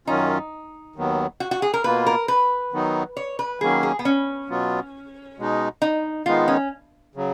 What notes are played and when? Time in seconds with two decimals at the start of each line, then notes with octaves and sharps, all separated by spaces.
0.07 F#2 D#3 F#3 C#4 D#4 F4
0.96 D#2 D#3 F#3 B3
1.40 F#4
1.51 F#4
1.62 G#4
1.74 A#4
1.84 B2 A#3 F4 B4
2.06 A#4
2.28 B4
2.73 D#3 F#3 B3 D#4
3.17 C#5
3.39 B4
3.61 D#3 F#3 A#3 C#4 G#4
3.83 G#4
3.99 B3
4.05 C#4
4.49 B2 F#3 B3 F4
5.38 B2 G#3 D#4
5.82 D#4
6.26 D#3 G#3 B3 D#4 F4
6.48 C#4
7.15 C#3 F#3